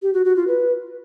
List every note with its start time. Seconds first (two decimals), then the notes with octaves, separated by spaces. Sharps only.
0.02 G4
0.14 F#4
0.25 F#4
0.36 F4
0.47 B4